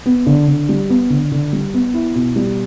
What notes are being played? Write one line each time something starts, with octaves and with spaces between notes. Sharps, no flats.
B3
D3
D3
G3
B3
D3
D3
G3
B3
E4
B2
G3